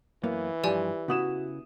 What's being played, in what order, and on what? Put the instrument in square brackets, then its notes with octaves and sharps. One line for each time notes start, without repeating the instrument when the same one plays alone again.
[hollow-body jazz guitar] F#2 A#3 B3 [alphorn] E3
[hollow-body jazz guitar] G2 F3 [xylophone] G4 D5 G#5
[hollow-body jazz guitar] C#3 B3 E4 [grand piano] F#4 D#6 E7